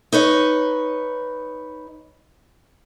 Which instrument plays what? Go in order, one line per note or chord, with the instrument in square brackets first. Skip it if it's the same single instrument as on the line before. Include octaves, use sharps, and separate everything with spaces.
[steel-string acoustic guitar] D#4 B4 C#5